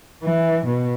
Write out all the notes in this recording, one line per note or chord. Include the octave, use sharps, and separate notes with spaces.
E3
B2